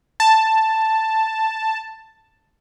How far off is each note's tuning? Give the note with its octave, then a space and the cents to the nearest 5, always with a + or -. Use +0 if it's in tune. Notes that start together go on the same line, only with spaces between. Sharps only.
A5 +5